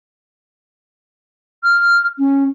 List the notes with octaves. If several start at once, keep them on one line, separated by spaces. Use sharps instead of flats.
F6
C#4